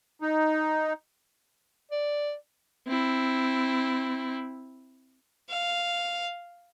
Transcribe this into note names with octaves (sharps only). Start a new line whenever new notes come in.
D#4
D5
C4 E4
F5